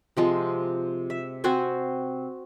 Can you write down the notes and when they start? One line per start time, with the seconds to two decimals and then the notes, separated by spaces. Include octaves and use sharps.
0.17 C3 F3 G#3
1.10 E5
1.44 C4 F#4 C5 G#5